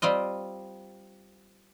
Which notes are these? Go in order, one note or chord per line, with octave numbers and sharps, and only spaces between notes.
G3 C4 F4 D#5